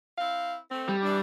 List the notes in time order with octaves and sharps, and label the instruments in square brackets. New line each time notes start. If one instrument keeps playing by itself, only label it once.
[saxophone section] C4 E4 F5
A3 C4
[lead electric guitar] G3
[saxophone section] E3 D4